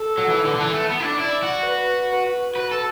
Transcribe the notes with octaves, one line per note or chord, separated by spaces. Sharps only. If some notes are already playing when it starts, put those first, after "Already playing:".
Already playing: A4
F#3
E3
D3
D3
E3
A3
B3
E4
D4
E4 D5
F#4
B4
B4
F#4 B4
A4